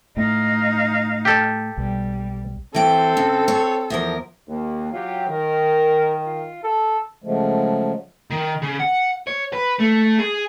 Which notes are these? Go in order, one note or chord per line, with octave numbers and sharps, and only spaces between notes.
A2 D#4 F5
G4 A4
B1 G3
E3 C4 A4 G5
C#3
C#5
E2 F3 A#4
D#2
F#3 F4 G4
D#3 A#4
F4
A4
C#3 F3 F#3 G#3 A3
D#3
C#3
F#5
C#5
B4
A3
G#4